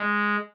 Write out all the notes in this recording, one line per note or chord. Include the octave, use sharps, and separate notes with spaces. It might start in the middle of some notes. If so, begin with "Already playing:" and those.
Already playing: G#3